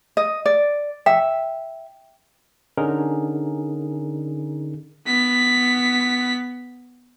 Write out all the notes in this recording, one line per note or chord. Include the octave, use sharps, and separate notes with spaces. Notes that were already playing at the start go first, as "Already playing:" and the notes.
D#5
D5
E5 G5
D3 C#4 D#4 G#4 A#4
B3 B6